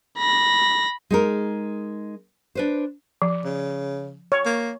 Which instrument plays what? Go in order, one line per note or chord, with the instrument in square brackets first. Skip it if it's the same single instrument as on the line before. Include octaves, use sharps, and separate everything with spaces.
[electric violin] B5 A#6
[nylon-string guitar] G#3 D#4 A#4
D4 B4 C5
[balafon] F3
[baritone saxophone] C#3
[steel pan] C#5
[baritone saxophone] A#3